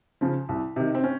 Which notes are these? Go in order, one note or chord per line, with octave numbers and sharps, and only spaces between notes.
C#3 F3
C2
C3 D#3
C4
C#4